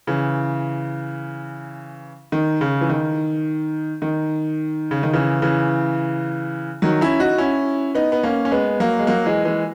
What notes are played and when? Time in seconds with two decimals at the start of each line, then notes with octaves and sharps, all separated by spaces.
0.07 C#3 E3
2.32 D#3
2.61 C#3
2.81 E3
2.89 D#3
4.02 D#3
4.91 C#3
5.03 D#3
5.13 C#3 E3
5.42 C#3 E3
6.82 D#3 F#3
7.01 C#4 E4
7.20 D#4 F#4
7.38 C#4 E4
7.95 B3 D#4
8.12 B3
8.23 A#3 C#4
8.45 C#4
8.51 G#3 B3
8.80 F#3 A#3
8.99 G#3
9.07 F#3 A#3
9.26 E3 G#3
9.45 E3 G#3